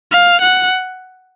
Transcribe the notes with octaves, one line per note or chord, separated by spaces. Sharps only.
F5
F#5